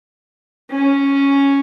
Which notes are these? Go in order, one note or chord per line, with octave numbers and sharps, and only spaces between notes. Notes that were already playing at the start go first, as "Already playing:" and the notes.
C#4